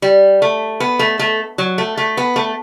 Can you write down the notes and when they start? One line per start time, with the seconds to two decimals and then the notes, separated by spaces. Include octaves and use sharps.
0.02 G3
0.42 A3
0.80 B3
0.99 A3
1.19 A3
1.58 F#3
1.78 A3
1.97 A3
2.17 B3
2.36 A3